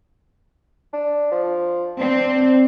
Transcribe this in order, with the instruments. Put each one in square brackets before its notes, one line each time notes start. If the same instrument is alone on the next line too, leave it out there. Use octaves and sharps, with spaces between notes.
[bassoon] D4
F3
[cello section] C4 [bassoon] D4